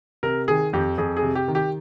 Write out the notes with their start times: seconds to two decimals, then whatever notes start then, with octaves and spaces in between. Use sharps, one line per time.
0.23 C3 A#4
0.48 D#3 G#4
0.73 F2 G4
0.98 F2 G#4
1.17 G#4
1.23 C3
1.35 G4
1.48 D#3
1.55 G4